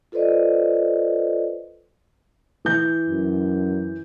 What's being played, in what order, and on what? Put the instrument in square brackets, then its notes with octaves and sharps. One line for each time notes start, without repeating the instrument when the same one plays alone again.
[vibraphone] F4 A4 B4 C5 D5 D#5
[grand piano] E3 G6
[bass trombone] F#2